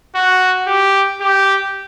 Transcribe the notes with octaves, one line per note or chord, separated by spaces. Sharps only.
F#4
G4
G4